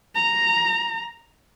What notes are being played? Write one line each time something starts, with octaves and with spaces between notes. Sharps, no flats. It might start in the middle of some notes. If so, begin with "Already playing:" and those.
A#5